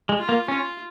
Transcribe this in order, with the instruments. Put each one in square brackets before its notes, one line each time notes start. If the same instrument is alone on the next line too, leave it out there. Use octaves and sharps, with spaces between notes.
[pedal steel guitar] G#3
[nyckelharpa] F4
[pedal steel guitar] A#3
[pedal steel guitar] C#4 [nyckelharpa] F4